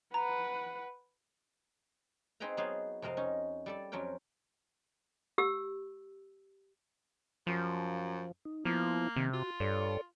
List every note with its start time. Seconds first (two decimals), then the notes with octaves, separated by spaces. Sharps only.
0.14 B4 F#5 A#5
2.40 C4 D#4 G#4 B4 G5 A#5
2.57 F#3 B3 D#4 G#4 C5 F5
3.02 F2 C3 A#4 D#5 F5
3.17 C#4 D#4
3.66 G3 A4 D5
3.92 F2 F#3 C#4 A#4 G5
5.38 G4 E6
7.47 F#2 F3
8.45 D#4
8.65 F3 A#3 B3 E4
9.16 C3 D#3 C4
9.33 F4 F#4
9.60 G2 A4 C#5 D5